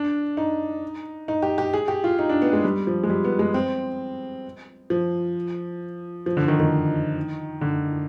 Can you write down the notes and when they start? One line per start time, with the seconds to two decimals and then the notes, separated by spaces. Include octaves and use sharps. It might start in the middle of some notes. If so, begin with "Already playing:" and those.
Already playing: D4
0.37 D#4
1.28 D#4
1.42 G4
1.58 G4
1.74 G#4
1.88 G4
2.04 F4
2.19 D#4
2.29 D4
2.42 B3
2.53 G#3
2.64 G3
2.87 F3
3.03 G#3
3.10 G3
3.25 B3
3.39 G#3
3.54 C4
4.90 F3
6.26 F3
6.37 D3
6.48 D#3
6.60 D#3
7.61 D3